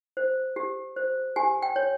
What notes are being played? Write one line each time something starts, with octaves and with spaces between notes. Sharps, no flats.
C5
G4
C5
G4 G#5
G5
C#5